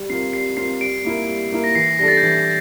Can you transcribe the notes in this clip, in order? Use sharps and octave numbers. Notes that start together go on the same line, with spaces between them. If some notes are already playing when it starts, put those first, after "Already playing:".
Already playing: G3
C4 F4 A#4 C7
G3 C7
C4 F4 A#4 C7
G3 D7
A#3 E4 A#4
G3
A#3 E4 A#4
A#6
E3 C7
G3 D4 A4 A#6
A6
G6
E3 A6